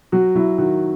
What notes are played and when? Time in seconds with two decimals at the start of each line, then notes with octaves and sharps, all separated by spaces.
0.12 F#3 F#4
0.35 F#3 E4
0.58 D#3 F#4